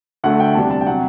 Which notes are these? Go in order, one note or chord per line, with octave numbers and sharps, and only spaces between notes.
D2 D3 A3 F#5
G5
E2 C3 G3 D4 A5
A5
G5
C3 F#3 F#5